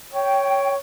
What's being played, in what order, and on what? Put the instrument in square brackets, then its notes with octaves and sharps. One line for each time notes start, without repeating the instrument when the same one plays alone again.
[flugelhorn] C#5 [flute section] G5